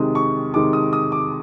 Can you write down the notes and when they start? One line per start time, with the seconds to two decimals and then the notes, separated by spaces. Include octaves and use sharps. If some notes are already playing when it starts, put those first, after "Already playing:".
Already playing: C3 D#3 G#3 D#6
0.15 C#6
0.54 C3 D#3 G#3 D6
0.73 D#6
0.93 D#6
1.12 D6